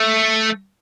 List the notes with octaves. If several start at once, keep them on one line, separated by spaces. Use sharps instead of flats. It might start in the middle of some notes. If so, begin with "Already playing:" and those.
Already playing: A3